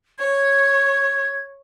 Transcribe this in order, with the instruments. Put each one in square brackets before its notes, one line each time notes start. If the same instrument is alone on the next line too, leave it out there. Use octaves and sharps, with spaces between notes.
[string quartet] C#5 [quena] G#6